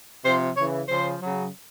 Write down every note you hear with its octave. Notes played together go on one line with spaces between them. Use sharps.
C3 F3 C5
C#3 E3 C#5
C#3 F3 C5
C#3 F#3